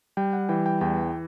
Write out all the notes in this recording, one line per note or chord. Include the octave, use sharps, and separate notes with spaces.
G3 G5
F#5
E3 G5
G5
E2 G5